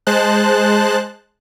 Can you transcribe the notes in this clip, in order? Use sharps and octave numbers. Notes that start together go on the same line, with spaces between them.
G#3 C5 A5 F#6